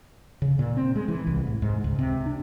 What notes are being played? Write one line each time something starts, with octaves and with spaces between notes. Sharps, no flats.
C#3
A#2
C4
G#3
E3
C2
A2
G#2
C#2
C3
D4